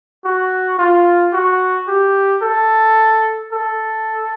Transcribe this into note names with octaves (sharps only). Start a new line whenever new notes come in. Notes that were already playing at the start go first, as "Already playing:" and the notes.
F#4
F4
F#4
G4
A4
A4